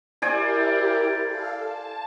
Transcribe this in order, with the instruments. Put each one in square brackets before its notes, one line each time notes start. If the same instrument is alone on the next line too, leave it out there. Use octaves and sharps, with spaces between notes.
[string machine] E4 G4 A#4 [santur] C5 D5 G#5
[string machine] A4 F5
A5